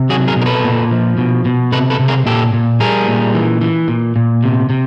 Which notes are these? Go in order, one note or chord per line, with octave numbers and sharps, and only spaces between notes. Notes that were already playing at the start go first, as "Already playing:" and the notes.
Already playing: C3
F#3 F#4 G#4
G#4 A#4
B2
A#4
A4 B4
A#2
F3
B2
B2
C3 A4 B4
A4 B4
C3
G#4 A#4
A#2 G4 A4
A#2
G3 G#4 A#4
A#2
E3
E3
A#2
A#2
C3
C3